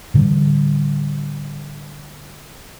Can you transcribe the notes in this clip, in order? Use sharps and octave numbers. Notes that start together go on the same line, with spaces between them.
A2 D3 E3 G3